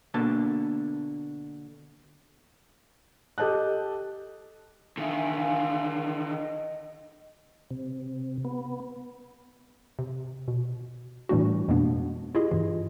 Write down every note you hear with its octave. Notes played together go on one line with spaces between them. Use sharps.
B2 D3 A#3 A5
G4 A4 D#5 A5 F#6
D3 D#3 E5 F5 G#5
D#5
C3
B3
C3
B2
A2 E3 G3 A3 D4 F#4
F2 B2 G#3 A#3 B3 D4
E4 F4 G4 G#4 D#5
G2 E3